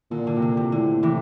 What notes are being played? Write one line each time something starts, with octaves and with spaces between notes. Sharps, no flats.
A#2 D3
D3
C3
D3
C3
A2 D3
C3 E3